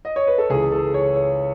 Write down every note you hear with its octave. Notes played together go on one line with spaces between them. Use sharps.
D#5
C#5
B4
A4
C#2 C#3 E3 G#4
A4
C#5
C#5